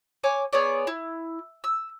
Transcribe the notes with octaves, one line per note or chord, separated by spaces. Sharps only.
C#5 G#5 D6
B3 G#4 C#5 D5
E4
E6